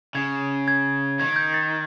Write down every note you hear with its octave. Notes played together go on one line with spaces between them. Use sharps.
C#3 G#6
G#6
D#3 G#6
G#6
G6
A6